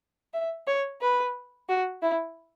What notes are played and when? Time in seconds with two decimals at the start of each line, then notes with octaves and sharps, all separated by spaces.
0.34 E5
0.67 C#5
1.02 B4
1.69 F#4
2.02 E4